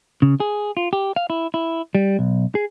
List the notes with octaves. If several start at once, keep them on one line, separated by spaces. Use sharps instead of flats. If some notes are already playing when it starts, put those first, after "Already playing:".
C#3
G#4
F4
G4
F5
E4
E4
G3
B1
G#4